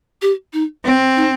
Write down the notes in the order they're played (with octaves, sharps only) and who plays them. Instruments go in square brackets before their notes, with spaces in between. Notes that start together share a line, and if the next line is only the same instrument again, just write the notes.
[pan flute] G4
D#4
[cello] C4
[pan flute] D#4